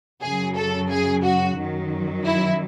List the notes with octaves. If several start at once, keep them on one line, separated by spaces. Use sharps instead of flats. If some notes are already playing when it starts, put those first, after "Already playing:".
F#2 C#3 F#3 G#4
A4
G#4
F#4
F#2 D#3 F#3
E4